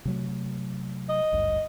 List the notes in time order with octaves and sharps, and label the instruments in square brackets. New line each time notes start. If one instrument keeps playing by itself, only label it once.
[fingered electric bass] C3 F#3 A3
[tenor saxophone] D#5
[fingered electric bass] G#1 D2 G2